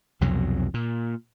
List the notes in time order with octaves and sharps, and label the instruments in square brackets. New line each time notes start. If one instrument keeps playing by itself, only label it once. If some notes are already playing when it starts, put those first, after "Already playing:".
[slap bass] C2 F2 B2 F#3
A#2